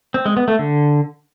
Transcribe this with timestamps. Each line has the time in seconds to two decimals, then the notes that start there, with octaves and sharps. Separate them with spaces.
0.14 C4
0.26 G#3
0.37 B3
0.48 A3
0.59 D3